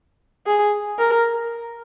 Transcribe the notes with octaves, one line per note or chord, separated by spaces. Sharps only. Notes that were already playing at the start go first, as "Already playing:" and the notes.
G#4
A#4